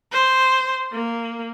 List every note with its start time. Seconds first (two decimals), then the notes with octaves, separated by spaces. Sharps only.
0.12 C5
0.92 A#3